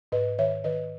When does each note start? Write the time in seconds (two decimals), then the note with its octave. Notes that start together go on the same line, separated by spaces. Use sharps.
0.12 G#2 B4 D#5
0.39 D#3 C#5 E5
0.64 D#3 B4 D#5